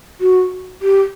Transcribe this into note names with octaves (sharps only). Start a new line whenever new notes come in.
F#4
G4